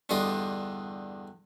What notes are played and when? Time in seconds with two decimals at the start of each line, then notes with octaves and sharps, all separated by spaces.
0.09 E2 G2 D3 F4 D#5